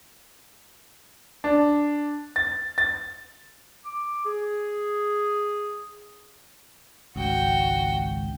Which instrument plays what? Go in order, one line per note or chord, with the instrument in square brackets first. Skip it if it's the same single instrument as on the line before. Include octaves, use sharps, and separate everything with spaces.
[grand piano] D4
A6
A6
[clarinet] D6
G#4
[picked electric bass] G#1 C#2 [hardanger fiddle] F#4 G5